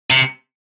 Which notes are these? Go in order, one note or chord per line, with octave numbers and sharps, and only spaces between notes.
C3